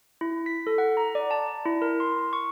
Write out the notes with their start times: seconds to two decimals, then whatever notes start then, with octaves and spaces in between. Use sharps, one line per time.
0.21 E4
0.46 B6
0.67 A4
0.78 F#5
0.97 A#5
1.15 D5
1.31 A5
1.65 E4
1.82 A#4
2.00 C6
2.33 C#6